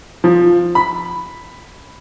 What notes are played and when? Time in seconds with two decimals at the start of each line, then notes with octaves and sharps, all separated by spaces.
0.24 F3
0.75 B5